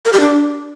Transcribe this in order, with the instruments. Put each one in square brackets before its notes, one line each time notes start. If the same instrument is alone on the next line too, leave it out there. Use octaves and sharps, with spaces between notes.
[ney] A#4
G4
D4